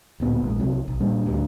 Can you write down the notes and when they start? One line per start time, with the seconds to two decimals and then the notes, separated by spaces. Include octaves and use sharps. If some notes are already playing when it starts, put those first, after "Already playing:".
0.20 D1 A#2 B3
0.44 A#1 G#2
0.59 C2 C3 F#3
0.88 B1
1.00 A#2 G3 D4
1.26 D1 D2 G2